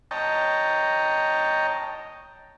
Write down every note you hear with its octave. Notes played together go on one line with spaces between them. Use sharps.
C#5 D#5 G5 A5 A#5